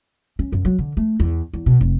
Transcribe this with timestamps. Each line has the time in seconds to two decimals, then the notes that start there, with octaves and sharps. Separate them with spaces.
0.39 C#4
0.52 F#2
0.65 F#3
0.79 D3
0.97 A3
1.20 E2
1.53 E2
1.66 B2
1.81 F1